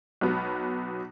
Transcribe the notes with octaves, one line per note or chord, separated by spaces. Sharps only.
B1 F#3 B3